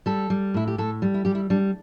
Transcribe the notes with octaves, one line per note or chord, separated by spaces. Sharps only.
G3 A4
G3
A2 E4
G4
A2 A4
G3
E4
G3 G4
E4
G3 D4